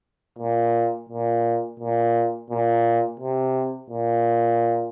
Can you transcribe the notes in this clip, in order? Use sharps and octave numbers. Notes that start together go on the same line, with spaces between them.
A#2
A#2
A#2
A#2
C3
A#2